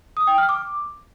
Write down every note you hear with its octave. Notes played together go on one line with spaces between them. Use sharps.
D#6
G5
F6
D6